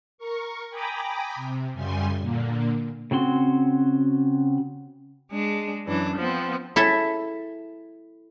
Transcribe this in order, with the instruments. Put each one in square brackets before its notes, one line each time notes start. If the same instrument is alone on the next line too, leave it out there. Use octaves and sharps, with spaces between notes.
[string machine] A#4 C#6
G5 G#5 A#5 B5 D6 D#6
C3
F#2 C#3 G3 G#5 C6
A#2 D3 A#3
[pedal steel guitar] C#3 C4 F#4 C6
[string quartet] G#3 D4
F#2 E3 D4
F3 B3 C4
[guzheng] E4 A4 E5 A5